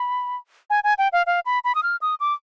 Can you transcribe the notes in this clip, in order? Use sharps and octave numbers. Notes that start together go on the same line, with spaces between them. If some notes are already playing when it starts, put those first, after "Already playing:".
Already playing: B5
G#5
G#5
G5
F5
F5
B5
B5
D#6
F6
D#6
D6